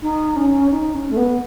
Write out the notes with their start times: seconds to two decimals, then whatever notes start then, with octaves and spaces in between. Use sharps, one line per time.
0.01 D#4
0.35 C#4
0.70 D#4
0.94 C#4
1.09 A3
1.16 B3